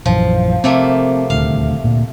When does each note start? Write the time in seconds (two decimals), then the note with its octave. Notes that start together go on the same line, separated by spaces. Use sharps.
0.06 A#1 F#2 E3 F3
0.64 C3 A3 A#3 C4
1.30 D#1 D2 F5
1.84 D2 A#2